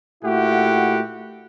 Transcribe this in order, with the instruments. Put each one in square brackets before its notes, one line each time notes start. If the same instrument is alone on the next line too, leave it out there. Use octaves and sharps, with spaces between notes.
[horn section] A#2 A3 E4 F#4 G4 F#5